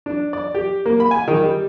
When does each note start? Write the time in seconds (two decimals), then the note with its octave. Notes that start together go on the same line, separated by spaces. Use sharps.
0.06 D4
0.33 D5
0.55 G4
0.86 A#3
1.00 B5
1.11 G#5
1.28 D#3
1.44 G3